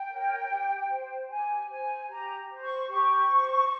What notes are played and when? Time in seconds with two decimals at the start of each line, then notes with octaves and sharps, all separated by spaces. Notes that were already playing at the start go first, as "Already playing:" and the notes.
Already playing: G5
0.09 A#4 C#5
0.48 G4
0.89 C5
1.29 G4 G#5
1.69 C5 G#5
2.09 G4 A#5
2.50 C5
2.62 C#6
2.89 G4 C#6
3.30 C5